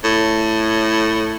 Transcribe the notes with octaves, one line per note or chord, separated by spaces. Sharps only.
A2